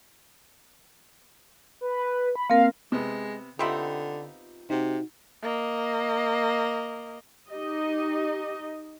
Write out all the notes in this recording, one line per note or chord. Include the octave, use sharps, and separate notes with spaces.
B4
B5
A#3 C4 A#4 F5
C3 G#3 B3
D3 B3 C4 D#4 F4 G4 E5 B5
C3 D#4 F#4
A#3 D#5
D#4 G4 D#5